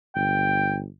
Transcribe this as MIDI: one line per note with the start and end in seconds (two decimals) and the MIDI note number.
0.15 0.88 31
0.15 0.76 79